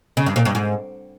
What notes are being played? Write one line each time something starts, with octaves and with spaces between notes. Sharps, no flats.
C#3
G2
A#2
G2
G#2